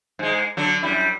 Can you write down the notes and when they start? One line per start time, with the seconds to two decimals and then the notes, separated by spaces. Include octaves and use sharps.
0.19 G#2 G#3
0.57 D3 F#3
0.82 F#2 G3 E4